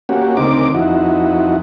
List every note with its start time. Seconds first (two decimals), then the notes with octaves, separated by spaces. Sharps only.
0.09 A#3 C#4 F#4 G4
0.37 D2 C#3 C4 D#4 A#4 D6
0.74 F2 D#4 E4 F#4